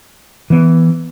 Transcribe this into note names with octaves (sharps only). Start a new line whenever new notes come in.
E3 B3